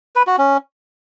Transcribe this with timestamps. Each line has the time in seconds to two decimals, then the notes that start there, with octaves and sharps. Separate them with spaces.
0.16 B4
0.27 F#4
0.38 C#4